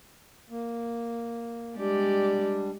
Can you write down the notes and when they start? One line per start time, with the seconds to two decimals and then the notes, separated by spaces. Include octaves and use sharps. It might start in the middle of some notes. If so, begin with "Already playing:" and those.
0.50 A#3
1.77 G3 G#3 D4 G4 D5